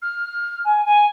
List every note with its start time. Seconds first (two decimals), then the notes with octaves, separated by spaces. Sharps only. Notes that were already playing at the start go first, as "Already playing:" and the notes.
0.02 F6
0.64 G#5
0.85 G#5